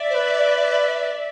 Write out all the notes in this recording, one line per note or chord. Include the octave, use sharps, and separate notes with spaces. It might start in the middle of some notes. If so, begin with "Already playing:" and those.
Already playing: D5 E5
C5
B4